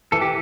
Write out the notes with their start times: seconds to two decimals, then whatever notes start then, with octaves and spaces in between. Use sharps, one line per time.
0.12 E3 A4
0.21 G4